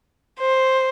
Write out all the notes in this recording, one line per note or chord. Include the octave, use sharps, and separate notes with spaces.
C5